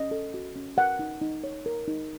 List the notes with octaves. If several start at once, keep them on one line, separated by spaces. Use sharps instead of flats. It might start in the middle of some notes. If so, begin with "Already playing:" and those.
Already playing: C#4 D#5
A4
F#4
C#4
A#4 F#5
D#4
D#4
C#5
A#4
D#4